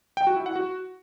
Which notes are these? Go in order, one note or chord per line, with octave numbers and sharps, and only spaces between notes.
G5
F#4
E4
F#5
F#4